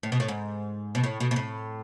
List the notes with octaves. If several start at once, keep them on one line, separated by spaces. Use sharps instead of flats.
A2
B2
A2
G#2
B2
A2
B2
B2
A2